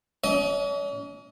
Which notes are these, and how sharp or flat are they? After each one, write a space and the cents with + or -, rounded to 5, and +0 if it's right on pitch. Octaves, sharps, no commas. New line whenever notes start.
C#4 +45 D#5 +20